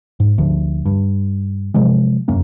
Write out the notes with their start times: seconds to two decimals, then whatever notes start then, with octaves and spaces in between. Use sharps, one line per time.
0.20 G#2
0.38 D2 F3
0.86 G2
1.74 C3 F3 F#3 G#3
2.28 F1 F#2 A#3 C#4